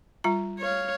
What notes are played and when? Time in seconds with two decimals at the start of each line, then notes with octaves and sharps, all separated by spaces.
0.24 G3 F4 A#5
0.60 C#5 F5